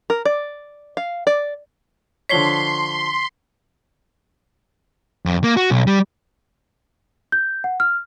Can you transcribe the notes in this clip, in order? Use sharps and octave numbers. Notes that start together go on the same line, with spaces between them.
A#4
D5
F5
D5
D3 F3 C#5 C6 B6 C7 G7
F2
A#3
F#4
B1
G3
G6
F#5
F6